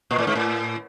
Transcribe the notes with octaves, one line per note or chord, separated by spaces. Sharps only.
A#2
A2
G#2
A2